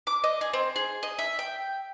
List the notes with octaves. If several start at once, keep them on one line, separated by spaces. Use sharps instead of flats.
D6
D#5
G#4
C4
G#4
D#5
E5
G5